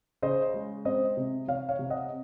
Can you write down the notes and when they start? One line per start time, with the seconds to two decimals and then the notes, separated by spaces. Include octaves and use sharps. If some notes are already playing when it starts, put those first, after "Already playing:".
0.22 C#3 C5 D#5
0.54 G#3
0.85 C4 C5 D#5
1.17 C3
1.48 C3 C#5 F5
1.69 C#5 F5
1.79 C3
1.90 D#5 F#5